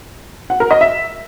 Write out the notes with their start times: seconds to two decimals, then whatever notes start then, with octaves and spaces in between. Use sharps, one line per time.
0.50 F#5
0.60 A#4
0.71 D#5
0.81 E5